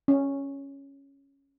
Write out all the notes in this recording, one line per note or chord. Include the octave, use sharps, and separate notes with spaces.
C#4